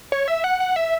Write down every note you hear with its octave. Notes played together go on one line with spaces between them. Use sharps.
C#5
E5
F#5
F#5
E5